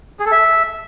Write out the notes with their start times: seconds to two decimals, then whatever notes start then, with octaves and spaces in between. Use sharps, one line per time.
0.20 G#4
0.26 A4
0.32 E5